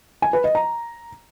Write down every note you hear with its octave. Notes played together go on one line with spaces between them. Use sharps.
G#5
B4
D#5
A#5